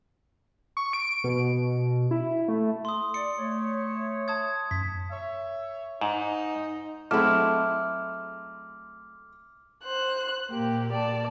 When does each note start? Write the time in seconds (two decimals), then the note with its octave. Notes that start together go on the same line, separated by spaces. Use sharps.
0.77 C#6
0.93 D7
1.24 B2
2.11 E4
2.48 A3
2.85 C6 D#6
3.14 D5 C#7
3.36 A3 C#5
4.28 A5 D#6 G#6
4.71 F#2 B6
5.11 C#5 E5
6.01 G#2 D#4
7.11 F#3 G#3 A3 C4 E4 D6 F6
9.84 C5 F#6
10.52 A#2 A#3 G4
10.92 D5 A5